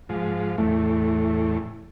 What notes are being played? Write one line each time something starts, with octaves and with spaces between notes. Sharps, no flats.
G#2 F3
E2 A2 A3